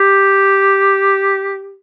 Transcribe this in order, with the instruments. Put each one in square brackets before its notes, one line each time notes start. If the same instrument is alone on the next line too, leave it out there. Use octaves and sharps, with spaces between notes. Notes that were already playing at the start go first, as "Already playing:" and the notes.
Already playing: [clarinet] G4